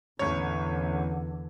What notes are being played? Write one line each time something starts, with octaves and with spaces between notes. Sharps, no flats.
A1 E2 D3 C#5